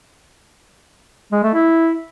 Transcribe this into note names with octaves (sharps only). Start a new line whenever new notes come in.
G#3
A3
E4